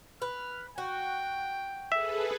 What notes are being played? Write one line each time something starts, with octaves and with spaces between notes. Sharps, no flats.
B4 F6
F#4 G5
G#4 A4 B4 E5